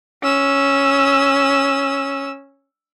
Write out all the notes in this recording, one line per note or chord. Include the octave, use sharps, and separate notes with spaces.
C#4 E6